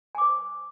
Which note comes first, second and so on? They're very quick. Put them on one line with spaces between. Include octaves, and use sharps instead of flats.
G#5 D6 C5